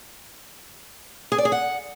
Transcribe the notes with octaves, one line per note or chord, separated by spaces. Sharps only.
G#4
D5
G#4
F#5